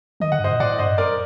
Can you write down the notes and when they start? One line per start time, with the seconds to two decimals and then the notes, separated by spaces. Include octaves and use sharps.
0.20 D#3 D#5
0.31 D3 F#5
0.40 G2 C5 D#5
0.50 A#2
0.60 A2 D5 F#5
0.78 G2 C5 D#5
0.98 F#2 A#4 D5